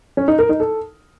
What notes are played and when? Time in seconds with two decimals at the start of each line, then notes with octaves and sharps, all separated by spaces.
0.17 C#4
0.28 D#4
0.39 A#4
0.49 D#4
0.60 A4